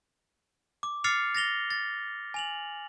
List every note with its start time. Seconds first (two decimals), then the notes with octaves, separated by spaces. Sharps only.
0.83 D6
1.04 D6 F6 A6 C7 C#7 F7
1.35 A6 A#6 F7 G7
1.71 A6
2.34 G#5 F7 F#7